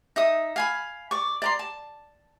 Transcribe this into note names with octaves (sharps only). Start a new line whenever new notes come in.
D#4 E5 D#6
F5 G#5 B5
D5 C#6
D5 A#5 C6
A5